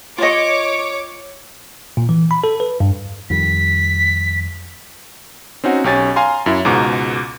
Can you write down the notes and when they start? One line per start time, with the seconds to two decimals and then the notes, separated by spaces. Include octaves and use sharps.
0.18 F4 C#5 D#5 D6
1.97 A#2
2.09 E3
2.31 B5
2.44 A4
2.60 B4
2.80 G2
3.30 F2 D#3 G3 B6
5.64 C4 C#4 D#4 F#4
5.84 B1 C#4 G4 C#5 G#5 A6
6.16 F5 G#5 A#5 C6
6.46 F#2 E4
6.65 C#2 G#2 B2 A#5 D6